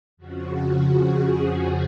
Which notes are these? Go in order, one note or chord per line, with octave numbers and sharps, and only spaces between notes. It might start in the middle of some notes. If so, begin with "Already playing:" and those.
F2 C#3 F3 F#4
G#4